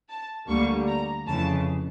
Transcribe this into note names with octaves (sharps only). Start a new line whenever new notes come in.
A5
D2 D3 G3 A#3 C#6
A#5
F2 C#3 E3 A5